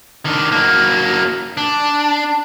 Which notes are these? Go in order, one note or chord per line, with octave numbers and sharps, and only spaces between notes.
D#3 D4
F#3 A#3
D4